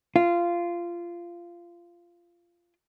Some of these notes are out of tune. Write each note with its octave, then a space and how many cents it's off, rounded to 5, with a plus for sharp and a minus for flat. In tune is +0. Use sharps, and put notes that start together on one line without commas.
F4 -15